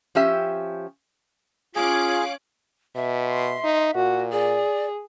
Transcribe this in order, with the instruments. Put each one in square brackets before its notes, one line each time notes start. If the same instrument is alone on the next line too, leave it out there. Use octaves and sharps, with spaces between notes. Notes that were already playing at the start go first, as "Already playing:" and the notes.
[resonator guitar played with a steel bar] F3 C#4 G4 E5
[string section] C#4 D6 F#6 [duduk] F4 [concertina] G#4 [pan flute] F5
[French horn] B2 [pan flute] E5
[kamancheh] C6
[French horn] D#4
[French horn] A#2 [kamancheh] F#4
[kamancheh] G#4 [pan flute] D5